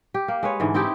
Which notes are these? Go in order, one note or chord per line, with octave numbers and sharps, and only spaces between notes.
G4
A#3
G#3 B4 C#5
G#2 D3 E3
C4 D#4 E4 G4